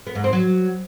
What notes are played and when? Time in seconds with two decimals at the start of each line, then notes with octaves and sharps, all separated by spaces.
0.07 B3
0.15 G#2
0.24 C4
0.33 F#3